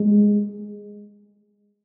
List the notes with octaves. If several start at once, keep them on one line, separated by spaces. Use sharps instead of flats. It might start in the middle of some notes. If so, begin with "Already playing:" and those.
Already playing: G#3